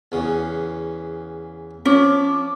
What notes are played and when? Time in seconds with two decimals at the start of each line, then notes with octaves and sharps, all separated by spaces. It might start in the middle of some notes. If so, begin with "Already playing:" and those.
0.12 E2 C#3
1.86 F3 C#4 D6